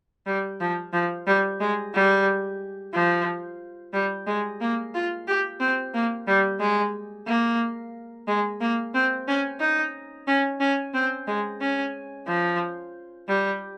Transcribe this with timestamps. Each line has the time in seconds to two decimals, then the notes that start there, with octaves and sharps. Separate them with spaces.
0.26 G3
0.61 F3
0.93 F3
1.27 G3
1.60 G#3
1.94 G3
2.94 F3
3.93 G3
4.27 G#3
4.61 A#3
4.94 F4
5.27 G4
5.60 C4
5.94 A#3
6.27 G3
6.60 G#3
7.27 A#3
8.28 G#3
8.61 A#3
8.94 C4
9.28 C#4
9.60 D#4
10.27 C#4
10.60 C#4
10.94 C4
11.27 G#3
11.61 C#4
12.27 F3
13.28 G3